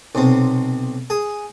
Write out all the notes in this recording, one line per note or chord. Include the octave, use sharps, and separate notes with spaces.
B1 C3
G#4